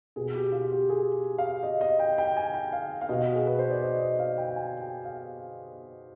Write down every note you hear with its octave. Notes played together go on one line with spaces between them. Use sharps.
B2 G#4
G4
F4
G4
G#4
F5
D#5
D#5
G5
G5
G#5
G5
F5
F5
B2 D#5
G#4
B4
C5
D5
D#5
D#5
F5
G5
G5
G#5
G5
F5